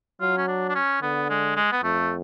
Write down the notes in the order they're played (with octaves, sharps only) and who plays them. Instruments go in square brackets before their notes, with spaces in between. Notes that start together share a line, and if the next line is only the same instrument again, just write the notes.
[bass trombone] F#3 [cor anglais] F4
[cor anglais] C#4
D4
D4
C#4
[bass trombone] D3 [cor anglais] B3
[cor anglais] G#3
G#3
B3
[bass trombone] F2 [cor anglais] A3